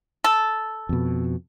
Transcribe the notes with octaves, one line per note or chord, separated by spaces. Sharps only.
A4
F2 B2